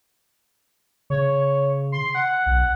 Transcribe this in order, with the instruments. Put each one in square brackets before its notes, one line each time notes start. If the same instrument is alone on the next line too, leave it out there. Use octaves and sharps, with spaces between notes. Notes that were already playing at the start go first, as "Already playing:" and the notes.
[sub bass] C#3 [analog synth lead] C#5
[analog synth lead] C6
F#5
[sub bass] B1